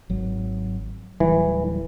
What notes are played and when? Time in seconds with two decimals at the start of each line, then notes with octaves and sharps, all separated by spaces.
0.09 G#1 F#3
1.20 D1 E3 F#3 G3